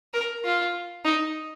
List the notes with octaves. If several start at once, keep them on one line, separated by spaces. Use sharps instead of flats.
A#4
F4
D#4